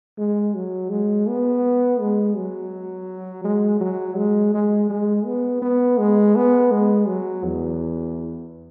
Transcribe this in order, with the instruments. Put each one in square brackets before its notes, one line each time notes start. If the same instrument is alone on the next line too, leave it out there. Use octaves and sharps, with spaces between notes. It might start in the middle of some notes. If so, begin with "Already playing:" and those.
[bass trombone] G#3
F#3
G#3
B3
G#3
F#3
G#3
F#3
G#3
G#3
G#3
B3
B3
G#3
B3
G#3
F#3
E2